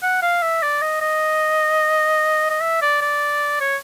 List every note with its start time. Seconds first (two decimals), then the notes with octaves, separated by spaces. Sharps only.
0.03 F#5
0.22 F5
0.42 E5
0.63 D5
0.82 D#5
1.02 D#5
2.50 D#5
2.61 E5
2.82 D5
3.01 D5
3.61 C#5